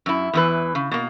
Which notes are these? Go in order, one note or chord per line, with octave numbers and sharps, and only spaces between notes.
F#2 E4
E2 E3 B4
C#3
B2 A#3